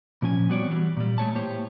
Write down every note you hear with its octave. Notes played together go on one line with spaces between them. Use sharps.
A#2 F3 C#4 G#5
G3 B3 C4 F#4 C#5 D5
E3 F#3 G3
A#2 G3
G#3 A3 C#5 A5
A2 A#3 G4 C5 C#5